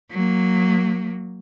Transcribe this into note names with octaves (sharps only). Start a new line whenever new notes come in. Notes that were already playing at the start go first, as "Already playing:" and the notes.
F#3 A#3